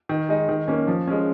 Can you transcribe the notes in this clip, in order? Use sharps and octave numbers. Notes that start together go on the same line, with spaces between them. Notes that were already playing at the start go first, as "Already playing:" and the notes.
D#3
G#3 D#4
D#3
A#3 C#4
F3
G#3 C#4